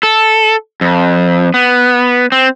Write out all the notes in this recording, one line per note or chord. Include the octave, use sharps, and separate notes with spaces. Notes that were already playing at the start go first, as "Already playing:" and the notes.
A4
F2
B3
C4